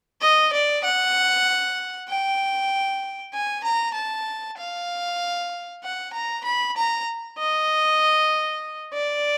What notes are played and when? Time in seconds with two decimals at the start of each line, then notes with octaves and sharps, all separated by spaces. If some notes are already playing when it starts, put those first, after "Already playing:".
0.23 D#5
0.54 D5
0.85 F#5
2.09 G5
3.34 G#5
3.65 A#5
3.96 A5
4.58 F5
5.83 F#5
6.14 A#5
6.45 B5
6.76 A#5
7.38 D#5
8.94 D5